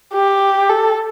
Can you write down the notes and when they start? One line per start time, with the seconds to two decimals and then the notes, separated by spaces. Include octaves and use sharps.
0.13 G4
0.69 A4